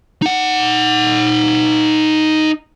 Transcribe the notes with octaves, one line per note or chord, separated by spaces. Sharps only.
D#4 F#5